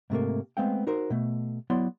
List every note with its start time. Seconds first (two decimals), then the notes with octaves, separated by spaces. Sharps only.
0.10 G#2 C3 A3 A#3
0.57 G#3 A3 B3 C4 F5 G5
0.87 D#4 F#4 A#4 C5
1.10 B2 A3
1.70 F#3 B3 E4 D5 C6